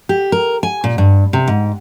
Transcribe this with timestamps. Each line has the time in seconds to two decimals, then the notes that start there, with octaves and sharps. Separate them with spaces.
0.09 G4
0.32 A#4
0.63 G#5
0.84 A#2
0.98 G2
1.33 C3
1.48 G#2